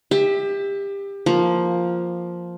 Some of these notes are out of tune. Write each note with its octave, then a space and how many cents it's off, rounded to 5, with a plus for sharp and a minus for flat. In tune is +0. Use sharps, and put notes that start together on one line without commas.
G4 +25 E5 -10
F3 +0 A#3 +5